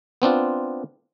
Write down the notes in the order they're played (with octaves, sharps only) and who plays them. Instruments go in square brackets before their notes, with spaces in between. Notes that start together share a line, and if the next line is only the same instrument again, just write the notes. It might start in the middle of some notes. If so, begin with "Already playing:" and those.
[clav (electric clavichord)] B3 C4 D4 F4